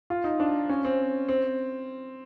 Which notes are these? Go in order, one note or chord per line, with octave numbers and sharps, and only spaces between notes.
F4
D#4
D4
C#4
C4
C4